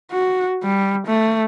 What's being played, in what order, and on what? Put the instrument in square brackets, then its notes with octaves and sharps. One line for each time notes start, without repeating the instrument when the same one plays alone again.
[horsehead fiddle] F#4
G3
A3